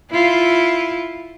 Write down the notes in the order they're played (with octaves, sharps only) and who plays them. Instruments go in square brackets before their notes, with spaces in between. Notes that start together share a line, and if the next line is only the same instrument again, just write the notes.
[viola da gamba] E4 F4